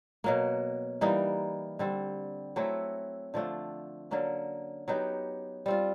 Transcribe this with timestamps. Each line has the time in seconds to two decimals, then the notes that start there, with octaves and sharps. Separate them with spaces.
0.24 B2 F#3 A#3
1.01 E3 G3 A#3 D#4
1.79 D3 G3 C4
2.56 F#3 A3 C4 E4
3.34 D3 F3 A3 D4
4.11 D3 F#3 A#3 C#4
4.88 F#3 B3 D#4 G4
5.66 G3 C4 F4